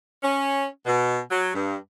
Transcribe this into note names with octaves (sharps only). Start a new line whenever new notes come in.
C#4
B2
F#3
G2